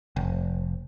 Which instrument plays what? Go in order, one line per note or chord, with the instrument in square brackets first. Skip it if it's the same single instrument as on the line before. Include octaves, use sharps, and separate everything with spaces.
[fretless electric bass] F1